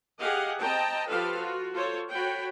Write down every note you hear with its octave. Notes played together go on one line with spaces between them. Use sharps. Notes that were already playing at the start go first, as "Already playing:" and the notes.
G4 G#4 D#5 F5 F#5
C4 D#5 G5 A5 A#5
F3 F4 G4 A4 B4 F5
F4 F#4
F4 A4 C5 C#5
F#4 C#5 G5 B5